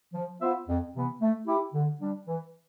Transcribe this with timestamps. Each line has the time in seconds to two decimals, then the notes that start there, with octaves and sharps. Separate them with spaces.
0.14 F3
0.42 B3 F4 C5 E5
0.68 F2
0.94 C3 E3 B3
1.21 A3
1.47 E4 G4
1.74 D3
2.01 G3 D4
2.27 E3